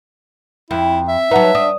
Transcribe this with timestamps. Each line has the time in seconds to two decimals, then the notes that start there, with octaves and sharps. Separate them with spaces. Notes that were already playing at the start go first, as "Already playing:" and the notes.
0.71 F2 E4
1.08 E5
1.31 F#3 D#4 B4 F#5 A5
1.55 D4 D#6